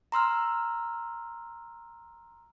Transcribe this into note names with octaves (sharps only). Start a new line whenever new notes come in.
A#5 C6 E6 F6